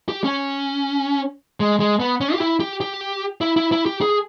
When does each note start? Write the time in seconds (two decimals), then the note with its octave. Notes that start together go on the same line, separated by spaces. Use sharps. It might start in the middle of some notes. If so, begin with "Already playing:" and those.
0.09 G4
0.24 C#4
1.60 G#3
1.80 G#3
2.00 B3
2.21 C#4
2.34 G4
2.40 E4
2.60 G4
2.81 G4
3.41 E4
3.56 E4
3.72 E4
3.86 G4
4.01 G#4